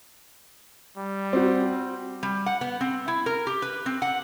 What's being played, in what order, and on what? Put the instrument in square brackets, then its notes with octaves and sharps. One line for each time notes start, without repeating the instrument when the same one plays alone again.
[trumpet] G3
[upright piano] C4 F#4
[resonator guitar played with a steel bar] G3
F#5
B3
C4
E4
A#4
G4
B4
C4
F#5